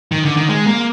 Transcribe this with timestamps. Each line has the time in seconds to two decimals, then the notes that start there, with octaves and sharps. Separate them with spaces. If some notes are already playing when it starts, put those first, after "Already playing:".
0.12 D#3
0.25 D3
0.37 D#3
0.49 G#3
0.67 A#3